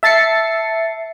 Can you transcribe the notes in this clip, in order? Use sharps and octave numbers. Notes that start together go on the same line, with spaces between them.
E5 A5 A6 C7 C#7